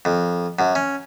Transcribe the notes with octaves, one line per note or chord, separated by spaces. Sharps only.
F2
F#2
C#4